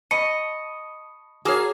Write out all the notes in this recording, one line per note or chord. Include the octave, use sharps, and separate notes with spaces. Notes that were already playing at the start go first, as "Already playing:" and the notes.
D#5 A5 B5 C#6 C#7
A#3 F#4 G#4 C#5 A5 F6